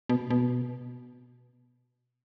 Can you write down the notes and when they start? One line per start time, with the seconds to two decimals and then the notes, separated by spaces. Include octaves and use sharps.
0.09 B2
0.30 B2